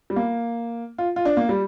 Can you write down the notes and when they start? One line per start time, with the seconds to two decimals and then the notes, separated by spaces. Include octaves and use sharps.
0.10 G3
0.16 A#3
0.98 F4
1.16 F4
1.25 D4
1.37 A#3
1.49 G3